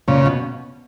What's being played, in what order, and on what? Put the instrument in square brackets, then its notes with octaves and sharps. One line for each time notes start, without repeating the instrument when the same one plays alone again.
[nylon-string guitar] A#2 [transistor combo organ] C#3
[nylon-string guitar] B2